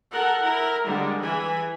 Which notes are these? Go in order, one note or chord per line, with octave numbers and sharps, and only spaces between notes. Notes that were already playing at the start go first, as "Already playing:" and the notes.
A4 A#4 F#5
E4 A#4
D3 G3 G#3
E3 G#5